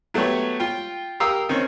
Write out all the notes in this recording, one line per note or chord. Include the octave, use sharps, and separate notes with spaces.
F#3 A3 B3 G4 C#5
F4 G5
G4 A#4 F5 D#6 E6
D#3 C4 C#4